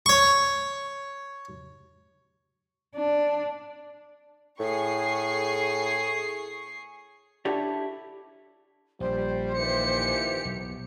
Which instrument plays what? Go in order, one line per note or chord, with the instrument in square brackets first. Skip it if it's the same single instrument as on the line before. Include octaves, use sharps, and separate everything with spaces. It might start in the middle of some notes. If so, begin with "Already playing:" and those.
[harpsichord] C#5 C#6
[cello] D4
[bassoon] A2 [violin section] G#4 C#6 C7
[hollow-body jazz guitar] D4 E4 G4 A4 C#5 D5
[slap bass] A#1 [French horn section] G3 [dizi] C5
[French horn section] A#2 D#3 E3 [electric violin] G4 C#7
[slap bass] B1